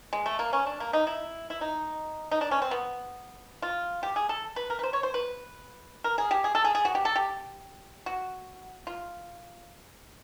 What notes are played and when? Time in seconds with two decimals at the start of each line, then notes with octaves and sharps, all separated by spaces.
0.13 G#3
0.26 A3
0.39 A#3
0.53 C#4
0.66 D4
0.80 A#3
0.93 D#4
1.07 E4
1.50 E4
1.61 D#4
2.31 D#4
2.41 D4
2.51 C#4
2.62 C4
2.71 B3
3.62 F4
4.03 G4
4.16 G#4
4.29 A4
4.56 B4
4.70 A#4
4.79 B4
4.83 C5
4.93 C#5
5.03 C5
5.14 B4
6.04 A#4
6.18 G#4
6.31 G4
6.44 G#4
6.55 A4
6.65 G#4
6.75 G#4
6.85 F#4
6.95 G4
7.05 A4
7.16 G4
8.06 F#4
8.87 F4